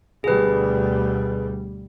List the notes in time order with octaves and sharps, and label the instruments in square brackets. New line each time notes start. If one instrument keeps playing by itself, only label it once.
[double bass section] D2 B2 G3 [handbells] G#4 B4